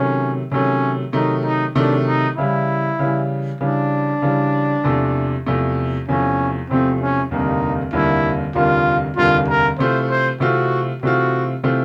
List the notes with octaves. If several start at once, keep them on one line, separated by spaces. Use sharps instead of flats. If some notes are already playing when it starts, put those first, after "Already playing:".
Already playing: C3 D#3 F#3 A3 C#4
C3 D#3 F#3 A3 C#4
C3 D#3 F#3 A3 D#4
D#4
C3 D#3 F#3 A3 D4
D#4
C#3 E3 G3 E4
C#3 E3 G3
C#3 E3 G3 D4
C#3 E3 G3
E2 C3 F3 A3
E2 C3 F3 A3
E2 C3 F3 A3 C#4
E2 C3 F3 A3 C4
C#4
F1 D#2 D3 G3 A#3 D#4
F1 D#2 D3 G3 A#3 E4
F1 D#2 D3 G3 A#3 F4
F1 D#2 D3 G3 A#3 F4
A#4
C3 E3 A3 C4 F4 C5
C5
C3 E3 A3 C4 F4 F#4
C3 E3 A3 C4 F4 F#4
C3 E3 A3 C4 F4